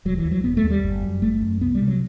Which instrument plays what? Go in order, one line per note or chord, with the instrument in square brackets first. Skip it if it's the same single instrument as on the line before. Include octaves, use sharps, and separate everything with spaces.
[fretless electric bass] E1 F#3
E3
D#2
F#3
E1 B3
A3
D#2
G3
G1
F#2
G1 A3
F#2
C2 B3
G3
C3
F#3